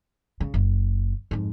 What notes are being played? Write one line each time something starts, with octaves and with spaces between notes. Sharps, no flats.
C#3
F#1
F2 G#2